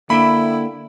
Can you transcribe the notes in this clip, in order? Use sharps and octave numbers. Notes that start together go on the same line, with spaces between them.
D3 A#3 E4 E5 G5 B5